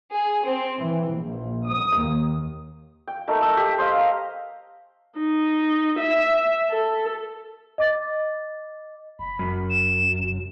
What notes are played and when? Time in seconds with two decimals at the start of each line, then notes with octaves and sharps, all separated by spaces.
0.14 G#4
0.43 C4
0.79 E3
1.10 A#1
1.68 D#6
1.99 D#2
3.07 G5
3.28 A3 D#4 A#4
3.42 E6
3.57 G4
3.78 C5 D#5 F5
3.97 A#5
5.17 D#4
5.99 E5
6.71 A4
7.78 D#5 D6 A6
9.19 F#1 B5
9.39 F#2
9.70 E7
10.18 F1